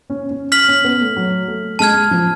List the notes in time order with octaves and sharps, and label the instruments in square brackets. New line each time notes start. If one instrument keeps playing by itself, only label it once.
[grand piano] C#4
C#4
[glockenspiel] F6 B6 F#7
[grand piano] C#4
B3
A3
F#3
A3
[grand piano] G#3 [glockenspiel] A5 F6 G#6
[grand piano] F3